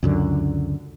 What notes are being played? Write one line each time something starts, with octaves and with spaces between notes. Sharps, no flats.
C#2 F#2 D3